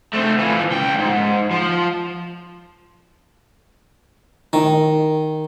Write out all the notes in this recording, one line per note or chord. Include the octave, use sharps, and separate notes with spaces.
A3 C4
E3 F3
C#2 G5
G#2
F3
D#3